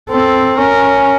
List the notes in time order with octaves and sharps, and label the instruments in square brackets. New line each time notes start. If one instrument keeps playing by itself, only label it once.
[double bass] C4 [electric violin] A4
[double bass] C#4 [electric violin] A#4